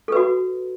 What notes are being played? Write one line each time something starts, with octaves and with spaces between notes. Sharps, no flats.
F#4 A4 B4